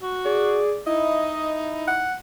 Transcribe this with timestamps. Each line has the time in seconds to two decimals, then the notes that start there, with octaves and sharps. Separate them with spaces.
0.02 F#4
0.25 G#4 D5
0.87 D#4 E4 D#5
1.87 F#5